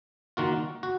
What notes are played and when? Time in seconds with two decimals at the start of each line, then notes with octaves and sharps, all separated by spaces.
0.37 D#3 A#3 F4 F#4
0.83 F#4